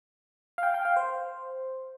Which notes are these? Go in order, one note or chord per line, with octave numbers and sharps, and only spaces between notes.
F5
G5
G5
F5
C5